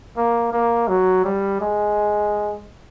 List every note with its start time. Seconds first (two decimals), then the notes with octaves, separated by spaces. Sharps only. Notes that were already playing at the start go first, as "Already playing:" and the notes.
0.17 A#3
0.53 A#3
0.88 F#3
1.24 G3
1.61 G#3